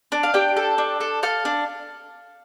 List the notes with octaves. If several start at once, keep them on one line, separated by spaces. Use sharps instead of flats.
D4
F5
D4 G4 G5
A4
D4
A4
A4 F5 F6
D4